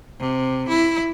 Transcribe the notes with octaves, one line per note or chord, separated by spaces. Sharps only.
C3
E4